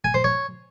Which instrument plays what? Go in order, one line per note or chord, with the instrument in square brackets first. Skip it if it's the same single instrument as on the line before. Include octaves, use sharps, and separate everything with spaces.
[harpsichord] G#5
C5
C#5